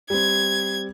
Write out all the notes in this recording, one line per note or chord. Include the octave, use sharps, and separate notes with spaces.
G3 C4 G#6